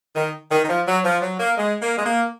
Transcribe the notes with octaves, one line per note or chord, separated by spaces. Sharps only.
D#3
D#3
D#3
F3
F#3
F3
F#3
A#3
G#3
A#3
G#3
A#3